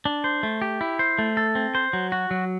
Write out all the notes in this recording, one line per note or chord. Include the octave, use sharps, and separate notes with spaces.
D4
C5
A3
G4
E4
C5
A3
A4
C4
C5
F#3
F#4
F#3